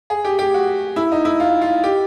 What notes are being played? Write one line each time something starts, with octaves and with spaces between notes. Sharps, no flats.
G#4
G4
G4
F#4
E4
D#4
E4
F4
F4
G4